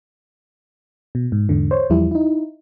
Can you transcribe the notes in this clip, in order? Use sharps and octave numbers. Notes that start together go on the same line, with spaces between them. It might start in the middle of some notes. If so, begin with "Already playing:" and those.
B2
G#2
E2 G#2 D3
C5 C#5
E2 F3 G3 E4
D#4 E4